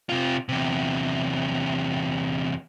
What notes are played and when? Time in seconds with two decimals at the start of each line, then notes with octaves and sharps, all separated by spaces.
0.09 C3 F4
0.49 E2 C3